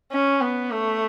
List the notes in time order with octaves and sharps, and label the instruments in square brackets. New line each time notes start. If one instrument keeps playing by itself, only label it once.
[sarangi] C#4
B3
A3